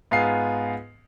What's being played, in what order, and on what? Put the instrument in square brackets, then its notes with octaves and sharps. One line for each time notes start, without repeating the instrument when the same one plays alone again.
[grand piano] G#2 B3 F4 G#4 F5 C7